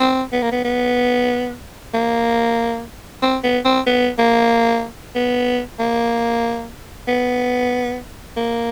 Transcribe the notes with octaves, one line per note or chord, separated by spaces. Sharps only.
C4
B3
A#3
B3
B3
A#3
C4
B3
C4
B3
A#3
B3
A#3
B3
A#3